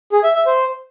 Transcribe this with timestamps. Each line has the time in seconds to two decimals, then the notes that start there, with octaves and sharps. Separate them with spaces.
0.12 G#4
0.24 E5
0.35 E5
0.46 C5